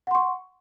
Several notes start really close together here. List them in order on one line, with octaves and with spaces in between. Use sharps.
F#5 C6 C#6